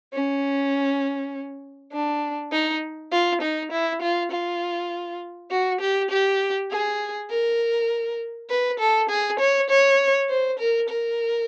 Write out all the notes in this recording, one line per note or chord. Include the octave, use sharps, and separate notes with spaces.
C#4
D4
D#4
F4
D#4
E4
F4
F4
F#4
G4
G4
G#4
A#4
B4
A4
G#4
C#5
C#5
C5
A#4
A#4